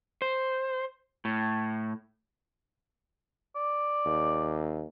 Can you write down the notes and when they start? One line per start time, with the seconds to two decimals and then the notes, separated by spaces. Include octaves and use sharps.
0.22 C5
1.25 A2
3.56 D5
4.06 D#2